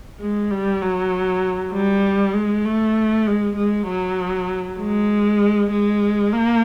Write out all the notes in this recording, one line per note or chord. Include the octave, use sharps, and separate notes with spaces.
G#3
G3
F#3
G3
G#3
A3
G#3
G#3
F#3
G#3
G#3
A#3